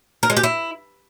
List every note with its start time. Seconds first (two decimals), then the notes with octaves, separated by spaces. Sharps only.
0.23 A#4
0.30 G#3
0.37 G4
0.43 E4